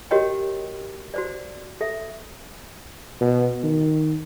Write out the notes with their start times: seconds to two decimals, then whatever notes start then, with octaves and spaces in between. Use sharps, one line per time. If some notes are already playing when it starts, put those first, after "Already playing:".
0.11 F#4 G4 A#4 C#5 D#5 G5
1.14 F#4 C5 D5
1.81 A4 E5
3.21 B2
3.63 D#3